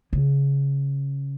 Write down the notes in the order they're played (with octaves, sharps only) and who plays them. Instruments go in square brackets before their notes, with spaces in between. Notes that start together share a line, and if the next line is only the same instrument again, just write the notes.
[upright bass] C#3